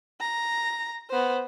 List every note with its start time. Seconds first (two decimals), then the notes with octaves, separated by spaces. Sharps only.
0.20 A#5
1.10 B3 C5